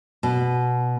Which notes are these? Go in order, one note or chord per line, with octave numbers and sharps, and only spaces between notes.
B2